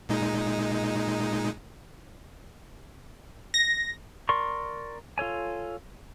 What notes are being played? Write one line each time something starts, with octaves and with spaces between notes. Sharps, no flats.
A#2 G#3 D#4
A#6
A#4 D5 C6 C#6
F4 A4 C#5 G#5